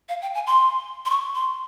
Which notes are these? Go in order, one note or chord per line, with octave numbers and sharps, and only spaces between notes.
F5
G5
G#5
C6
C6
C#6
C6